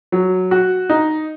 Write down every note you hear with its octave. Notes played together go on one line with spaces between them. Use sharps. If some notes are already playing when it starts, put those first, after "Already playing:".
F#3
F#4
D#4